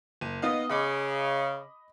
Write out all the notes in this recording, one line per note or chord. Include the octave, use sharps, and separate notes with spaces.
F#1 D#7
B3 D#4 D#5 F5
C#3 D#5 B5 D6